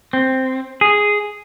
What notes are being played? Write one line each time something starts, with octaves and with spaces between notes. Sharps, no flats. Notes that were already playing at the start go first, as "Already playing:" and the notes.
C4
G#4